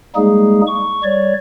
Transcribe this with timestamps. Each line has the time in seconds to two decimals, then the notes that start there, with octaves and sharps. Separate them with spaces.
0.16 G3 G#3 A#3 D#4 G#4
0.67 C#6
1.04 G3 C#5 D5